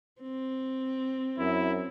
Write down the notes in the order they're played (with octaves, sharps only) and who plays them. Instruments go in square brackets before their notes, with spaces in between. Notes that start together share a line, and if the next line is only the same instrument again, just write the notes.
[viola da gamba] C4
[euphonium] F#2 [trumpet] E4